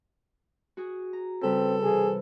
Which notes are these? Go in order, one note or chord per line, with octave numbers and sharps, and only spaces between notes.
F#4 G#4
A#5
C#3 G3 C4 A4 B4
C3 E3 G#4